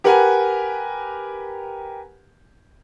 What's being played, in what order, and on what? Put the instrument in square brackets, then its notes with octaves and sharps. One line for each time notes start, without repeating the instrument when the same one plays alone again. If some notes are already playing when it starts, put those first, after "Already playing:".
[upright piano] G4 A#4 B4 F#5 G#5